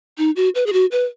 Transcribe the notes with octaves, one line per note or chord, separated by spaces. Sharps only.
D#4
F#4
B4
G#4
F#4
B4